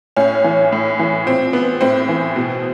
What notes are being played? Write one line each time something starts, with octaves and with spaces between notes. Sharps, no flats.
A2 C#4
E3
A2
E3
A#2 C4
B3
A2 C4
E3
B2